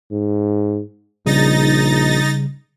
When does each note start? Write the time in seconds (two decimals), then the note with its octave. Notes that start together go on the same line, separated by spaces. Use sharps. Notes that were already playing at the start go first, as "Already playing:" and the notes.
0.11 G#2
1.26 A#1 C#3 G3 D#4 A6 A#6